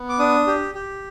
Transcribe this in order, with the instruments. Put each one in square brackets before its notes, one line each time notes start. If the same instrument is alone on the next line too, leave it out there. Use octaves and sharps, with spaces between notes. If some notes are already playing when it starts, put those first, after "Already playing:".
Already playing: [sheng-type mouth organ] B3
D6
D4 D#6
G4
G4